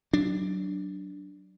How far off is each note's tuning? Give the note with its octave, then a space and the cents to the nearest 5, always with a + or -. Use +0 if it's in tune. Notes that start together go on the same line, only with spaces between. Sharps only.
F#3 +20 D4 +0